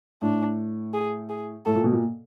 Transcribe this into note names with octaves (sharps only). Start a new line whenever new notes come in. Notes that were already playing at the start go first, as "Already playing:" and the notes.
A2 D4
G#4
G#4
A2 A4
A#2
B2
A#2